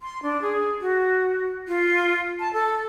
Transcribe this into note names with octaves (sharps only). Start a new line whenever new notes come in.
C6
D4
G#4
F#4
F4
A5
A4